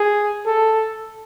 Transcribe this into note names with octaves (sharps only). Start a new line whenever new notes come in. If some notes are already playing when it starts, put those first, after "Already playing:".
Already playing: G#4
A4